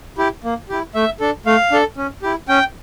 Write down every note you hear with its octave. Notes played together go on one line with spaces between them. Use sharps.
E4 G4
A#3
E4 G4
A3 E5
D4 A4
A3 F5
D4 A4
C#4
E4 G4
C#4 G5